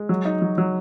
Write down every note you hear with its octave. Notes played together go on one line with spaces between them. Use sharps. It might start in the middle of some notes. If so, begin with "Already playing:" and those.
Already playing: G#3
F#3
D#4
F#3
F#3